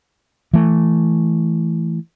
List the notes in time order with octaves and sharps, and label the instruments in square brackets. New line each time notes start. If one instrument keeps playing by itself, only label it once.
[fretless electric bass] E3 A3